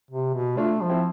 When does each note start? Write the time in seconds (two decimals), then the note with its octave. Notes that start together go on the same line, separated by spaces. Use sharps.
0.11 C3
0.34 B2
0.57 A3 D4 F4
0.81 F3
0.89 C4 E4